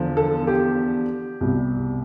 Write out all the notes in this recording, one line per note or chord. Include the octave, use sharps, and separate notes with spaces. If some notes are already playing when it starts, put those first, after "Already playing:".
Already playing: E2 D3 F3
A4
G4
C2 B2 G3